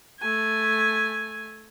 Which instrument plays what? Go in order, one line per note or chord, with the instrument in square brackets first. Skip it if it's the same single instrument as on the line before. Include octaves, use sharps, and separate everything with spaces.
[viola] A3 G#5